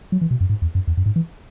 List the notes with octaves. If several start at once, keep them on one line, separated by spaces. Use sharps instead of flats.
F#3
E3
B2
F#2
G#2
E2
F#2
E2
F#2
G#2
E3